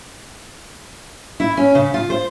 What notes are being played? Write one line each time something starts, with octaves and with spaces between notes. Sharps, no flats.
E4
C#4
C#3
F4
C5